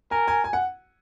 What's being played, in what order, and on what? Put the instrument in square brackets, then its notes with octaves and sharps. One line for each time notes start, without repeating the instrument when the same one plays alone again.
[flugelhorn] A#4 [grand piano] G#5
[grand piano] G#5
G#5
F#5